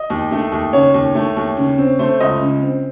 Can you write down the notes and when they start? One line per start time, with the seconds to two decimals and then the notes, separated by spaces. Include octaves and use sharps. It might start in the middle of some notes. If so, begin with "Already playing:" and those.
Already playing: D#5
0.10 D#2
0.31 A3
0.52 D#2
0.73 C#3 C#5
0.94 D#2
1.15 A3
1.37 D#2
1.57 C#3
1.78 C4
1.99 A3 C5
2.20 C#2 D#5
2.41 C#3
2.62 C4